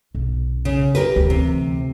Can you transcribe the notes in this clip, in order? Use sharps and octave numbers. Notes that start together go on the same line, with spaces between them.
B1
C#3
G4 A#4 B4
D2 E3
C3